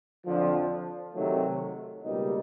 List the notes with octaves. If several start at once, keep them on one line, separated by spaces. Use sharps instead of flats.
F2 D3 F3
C3 D#3 F#3 A3
C#2 B2 G3 A#3 D#4